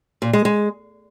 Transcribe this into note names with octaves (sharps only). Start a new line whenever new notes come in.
A#2
G#3
G#3